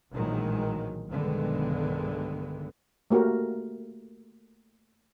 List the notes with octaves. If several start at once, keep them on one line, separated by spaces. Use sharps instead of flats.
A#1 A2 D#3 E3 F#3 G#3
B1 G2 D3 D#3 G#3 B3
A3 A#3 F#4 G4 A#4